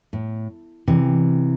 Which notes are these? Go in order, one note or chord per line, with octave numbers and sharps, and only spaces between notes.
A2
C3 E3